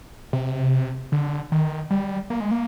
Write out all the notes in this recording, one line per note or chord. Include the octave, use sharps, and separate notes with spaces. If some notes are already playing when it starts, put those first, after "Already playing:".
C3
D3
D#3
G3
A#3
G#3
A#3